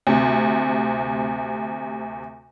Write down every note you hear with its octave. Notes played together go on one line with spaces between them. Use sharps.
D2 C3